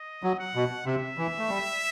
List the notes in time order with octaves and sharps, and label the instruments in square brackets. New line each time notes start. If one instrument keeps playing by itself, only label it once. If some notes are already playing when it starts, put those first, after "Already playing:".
Already playing: [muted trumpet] D#5
[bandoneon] F#3
[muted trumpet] F#5
[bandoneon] B2
[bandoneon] C3 [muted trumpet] E5
[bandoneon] E3
A3
G3